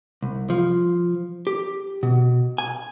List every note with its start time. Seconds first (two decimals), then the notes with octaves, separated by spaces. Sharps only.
0.22 C2
0.50 F3
1.47 G4
2.03 B2
2.58 G#5